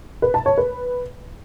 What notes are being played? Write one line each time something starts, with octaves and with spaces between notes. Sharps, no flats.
B4
A5
C#5
B4